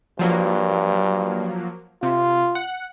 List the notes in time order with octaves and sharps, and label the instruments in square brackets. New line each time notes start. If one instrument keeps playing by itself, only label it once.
[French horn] G2 [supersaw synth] F3 F#3 A#3
[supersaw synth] C3 [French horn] F4
[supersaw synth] F#5